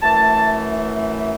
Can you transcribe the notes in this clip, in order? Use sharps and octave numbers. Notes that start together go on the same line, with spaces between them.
F#2 E3 A3 A5